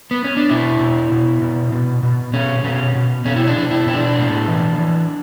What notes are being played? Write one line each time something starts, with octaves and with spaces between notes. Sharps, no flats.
B3
C#4
D4
B2 E4
B2
B2
B2
B2
B2
B2 C#4
B2 C#4
B2
B2 C#4
E4
D4
B2
E4
B2 E4
D4
A2
E3
E3